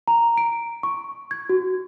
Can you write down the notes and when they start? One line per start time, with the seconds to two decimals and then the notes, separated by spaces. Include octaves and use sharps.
0.08 A#5
0.37 D7
0.83 C#6
1.31 G#6
1.49 F#4